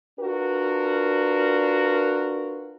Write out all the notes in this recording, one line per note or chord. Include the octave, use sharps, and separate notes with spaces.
D4 F4 F#4 A#4 B4